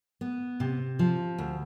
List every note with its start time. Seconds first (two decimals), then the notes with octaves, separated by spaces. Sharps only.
0.21 B3
0.60 C3
0.99 F3
1.38 D2